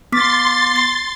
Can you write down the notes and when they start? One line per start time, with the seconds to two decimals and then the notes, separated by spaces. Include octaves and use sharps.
0.12 B3 C6 D6 A6 B6
0.76 C7